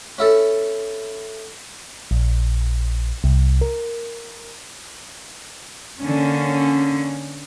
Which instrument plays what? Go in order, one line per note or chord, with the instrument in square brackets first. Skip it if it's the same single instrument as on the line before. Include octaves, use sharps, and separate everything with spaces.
[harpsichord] C#4 E4 A4
[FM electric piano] A#1
C2
A#4
[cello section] D3 A#3 C#4